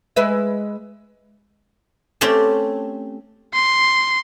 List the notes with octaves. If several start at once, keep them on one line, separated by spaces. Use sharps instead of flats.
G#3 B4 E5
A3 C4 C#4 G4 A4
C6